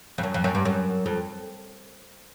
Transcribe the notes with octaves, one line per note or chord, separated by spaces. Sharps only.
F2
F#2
F2
F#2
G2
F#2
F2